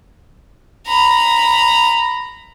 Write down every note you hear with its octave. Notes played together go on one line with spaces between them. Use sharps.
A#5 B5